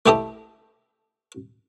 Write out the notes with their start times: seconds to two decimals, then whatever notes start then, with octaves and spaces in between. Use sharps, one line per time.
0.06 A3 E4 G4 A4 D#5